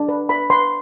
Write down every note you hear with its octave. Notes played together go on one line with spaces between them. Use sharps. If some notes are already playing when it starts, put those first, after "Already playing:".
Already playing: D4
B4
B4 B5
B4 C6